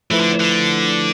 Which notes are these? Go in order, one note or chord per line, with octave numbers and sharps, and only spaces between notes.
E3 F3 A3 E4 B4
D3
D3